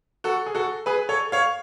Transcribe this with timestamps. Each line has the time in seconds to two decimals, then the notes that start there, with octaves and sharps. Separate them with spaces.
0.24 F#4 A4
0.46 G#4
0.55 F#4 A4
0.86 G#4 B4
1.09 A4 C#5
1.32 C#5 F5